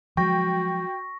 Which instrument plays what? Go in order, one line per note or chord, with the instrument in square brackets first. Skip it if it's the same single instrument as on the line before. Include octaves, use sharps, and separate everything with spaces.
[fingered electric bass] F3 F#3 G#3 [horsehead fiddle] F#4 [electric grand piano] G5 [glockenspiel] C#6 A#6